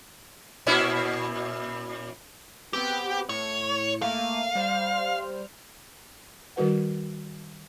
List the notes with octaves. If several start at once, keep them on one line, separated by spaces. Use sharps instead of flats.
A#2 C#4 E4
B3 C4 G4 B4
A2 C#5 C#7
A3 A#3 F5 D#7
G3 C5 F6
D#3 G3 F#4 B4 F#5